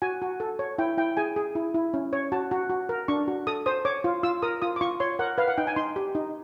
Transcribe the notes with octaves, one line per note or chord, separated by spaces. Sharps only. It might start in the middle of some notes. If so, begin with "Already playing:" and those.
F#4 G#5
F#4
A4
C#5
E4 G5
E4 G5
G#4 G#5
G#4
E4
E4
C#4
C#5
F#4 A5
F#4
F#4
A#4
D4 C#6
F#4
A4 D#6
C5 D#6
C#5 D6
F4
F4 E6
A#4 D#6
F4 D#6
D6
F4 C#6
C#5 C6
A#4 F#5
B4 F5
F#5
D#4 G5
G#5
D#4 C6
G4
D#4